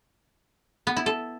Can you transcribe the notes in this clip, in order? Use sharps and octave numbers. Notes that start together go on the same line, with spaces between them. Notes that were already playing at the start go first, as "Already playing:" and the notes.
B3
E4
A4